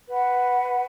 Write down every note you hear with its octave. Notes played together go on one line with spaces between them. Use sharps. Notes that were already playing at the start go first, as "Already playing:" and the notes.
B4 F#5